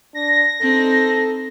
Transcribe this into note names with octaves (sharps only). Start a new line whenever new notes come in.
D4 A#6
C4 D#4 A4